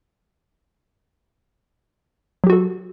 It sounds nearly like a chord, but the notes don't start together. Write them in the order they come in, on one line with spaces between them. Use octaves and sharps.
F#3 G4 F#4 A4